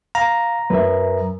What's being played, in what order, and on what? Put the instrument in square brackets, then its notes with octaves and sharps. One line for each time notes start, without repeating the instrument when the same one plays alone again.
[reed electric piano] F5 [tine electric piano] A#5
[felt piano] F#2 [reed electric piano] B4 E5